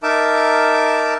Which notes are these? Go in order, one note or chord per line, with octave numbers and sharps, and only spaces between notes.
D#4 A#4 E5 A5 D6